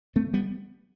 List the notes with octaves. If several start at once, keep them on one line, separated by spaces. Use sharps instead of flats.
A3 C4
G3 B3